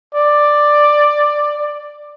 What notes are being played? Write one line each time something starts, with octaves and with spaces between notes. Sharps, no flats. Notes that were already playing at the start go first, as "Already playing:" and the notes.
D5